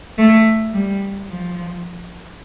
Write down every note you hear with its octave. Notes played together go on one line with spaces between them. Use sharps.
A3
G3
F3